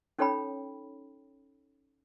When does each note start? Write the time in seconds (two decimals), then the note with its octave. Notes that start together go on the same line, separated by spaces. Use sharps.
0.19 C#4 D#4 A4 C#5 G5 B5